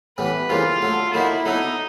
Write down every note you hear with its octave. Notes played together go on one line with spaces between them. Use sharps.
A2 E3 G3 B3 B4
F2 C#3 E3 G3 A#3 F4
D3 F#3 A3
D3 F#3 A#3 D#4 E4
D3 F#3 B3 D#4 E4